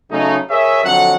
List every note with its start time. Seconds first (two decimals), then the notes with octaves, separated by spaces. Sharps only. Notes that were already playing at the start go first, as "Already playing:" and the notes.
0.11 C#3 F#3 A3 D#4
0.50 G#4 A#4 C#5 D#5 E5
0.84 F2 D3 F#3 F#5